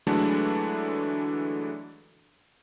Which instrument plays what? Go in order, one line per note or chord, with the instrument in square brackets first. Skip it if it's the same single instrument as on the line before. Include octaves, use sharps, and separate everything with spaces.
[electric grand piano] D3 E3 F#3 G#3 A3 D4